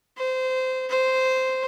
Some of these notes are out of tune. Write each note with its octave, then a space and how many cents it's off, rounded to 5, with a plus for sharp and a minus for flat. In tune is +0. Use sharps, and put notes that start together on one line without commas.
C5 -20
C5 -10